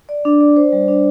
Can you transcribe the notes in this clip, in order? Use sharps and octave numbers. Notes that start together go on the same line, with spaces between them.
D5
D4
D5
C5
G3
D4